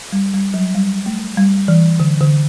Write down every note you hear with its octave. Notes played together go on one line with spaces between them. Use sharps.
G3
G3
F#3
G3
A3
G3
E3
D3
D3